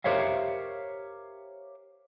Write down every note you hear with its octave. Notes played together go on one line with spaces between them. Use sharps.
G4 A#4 C5 C#5 E5 F5